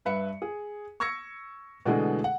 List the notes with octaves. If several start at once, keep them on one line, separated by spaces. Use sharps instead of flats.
G2 B4 E5 C#7
G#4
C#6 E6 G#6 A#6 C#7
B2 D3 E3 G#3 A3 G#4
F#5